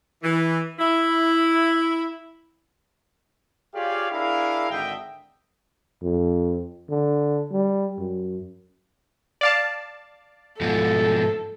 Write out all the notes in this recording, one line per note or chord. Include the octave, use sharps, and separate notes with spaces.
E3
E4
F4 G4 G#4 C#5 D5 F5
D4 E4 G#4 A#4 F5
G#1 D3 D4 D#5 E5 G5
F2
D3
G3
F#2
D5 F5 A5
G#2 B2 F3 A4